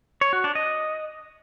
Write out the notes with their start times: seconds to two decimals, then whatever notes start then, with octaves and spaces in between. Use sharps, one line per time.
0.21 C#5
0.33 F#4
0.44 D4
0.55 D#5